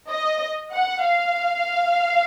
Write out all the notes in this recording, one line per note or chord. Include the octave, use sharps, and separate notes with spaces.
D#5
F#5
F5